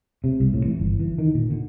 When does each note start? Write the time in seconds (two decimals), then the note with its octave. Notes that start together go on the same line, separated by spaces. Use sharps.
0.24 C3
0.40 C2
0.53 A2
0.66 E3
0.79 G1
1.00 E3
1.18 D#3
1.35 A#2
1.51 D3